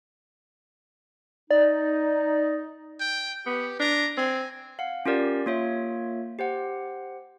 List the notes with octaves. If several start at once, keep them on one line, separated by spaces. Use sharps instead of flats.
D#4 D5
G5
B3 G4
D4 A#5
C4 G#5
F5 F#5
C#4 F4 G4 A#4 D5
A#3 F4 C#5 E5
G4 C5 F#5